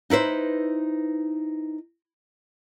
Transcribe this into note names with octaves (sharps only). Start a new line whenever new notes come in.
D#4 E4 B4 C5